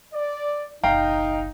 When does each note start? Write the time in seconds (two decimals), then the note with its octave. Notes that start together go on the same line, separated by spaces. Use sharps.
0.13 D5
0.83 F#1 B1 D#4 F5 G5 A#5